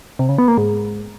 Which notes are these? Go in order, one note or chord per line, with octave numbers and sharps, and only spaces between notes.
C3
C#3
B3
A#3
G#2